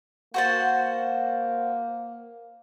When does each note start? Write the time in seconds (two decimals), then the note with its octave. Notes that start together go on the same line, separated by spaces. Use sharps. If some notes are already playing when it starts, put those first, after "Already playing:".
0.34 A#3 F#4 C5 A5